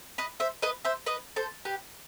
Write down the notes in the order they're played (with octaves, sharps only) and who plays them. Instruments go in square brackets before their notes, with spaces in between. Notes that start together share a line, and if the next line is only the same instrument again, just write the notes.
[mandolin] B4 D#5
C5 E5
B4 D#5
C5 E5
B4 D#5
A4 C5
G4 B4